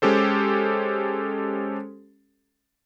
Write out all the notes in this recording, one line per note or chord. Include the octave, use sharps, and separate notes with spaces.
G#3 C#4 G4 A4 C5